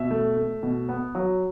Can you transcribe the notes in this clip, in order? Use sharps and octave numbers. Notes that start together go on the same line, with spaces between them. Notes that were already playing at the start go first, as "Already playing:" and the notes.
Already playing: B2 E5
A3
A3
B2
B3
F#3